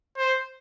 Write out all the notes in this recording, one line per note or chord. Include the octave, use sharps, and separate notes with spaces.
C5